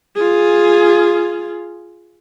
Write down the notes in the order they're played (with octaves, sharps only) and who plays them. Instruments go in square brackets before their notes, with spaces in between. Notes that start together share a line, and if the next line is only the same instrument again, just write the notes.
[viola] F4 G#4